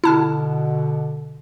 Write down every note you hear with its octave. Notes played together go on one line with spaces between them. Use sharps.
B2 D3 E4 A5 F6